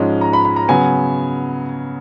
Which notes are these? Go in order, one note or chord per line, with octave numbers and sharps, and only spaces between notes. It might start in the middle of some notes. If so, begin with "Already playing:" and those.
Already playing: G#2 F3 G#3 C#4
A#5
B5
B5
A#5
C#3 F#3 B3 G#5